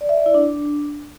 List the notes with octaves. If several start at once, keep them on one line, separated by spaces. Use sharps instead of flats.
D5
E5
D5
E4
D4